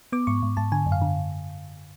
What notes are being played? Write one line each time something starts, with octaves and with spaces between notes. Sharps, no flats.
B3 D6
G#2 C#6
G#2
G#2 A5
D3 G#5
F#2
F5
D3